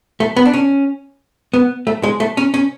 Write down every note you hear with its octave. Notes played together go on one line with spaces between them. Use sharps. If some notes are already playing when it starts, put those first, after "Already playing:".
A3
B3
D4
C#4
B3
A3
G#3
A3
C#4
C#4